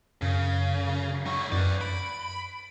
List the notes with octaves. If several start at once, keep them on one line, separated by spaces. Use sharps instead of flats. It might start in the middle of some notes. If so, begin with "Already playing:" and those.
F#2 C#3
F#3 E4 C#6
F#2 B4 D5
B5 D7